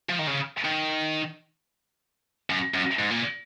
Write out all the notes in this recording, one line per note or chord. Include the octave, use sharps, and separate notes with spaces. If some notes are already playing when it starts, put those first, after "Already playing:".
F3
D#3
C#3
D#3
F#2
F#2
G#2
A#2